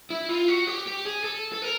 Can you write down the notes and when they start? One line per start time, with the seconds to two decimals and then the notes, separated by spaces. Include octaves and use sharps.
0.10 E4
0.29 F4
0.48 F#4
0.67 G4
0.87 G4
1.05 G#4
1.24 A4
1.52 A4
1.62 A#4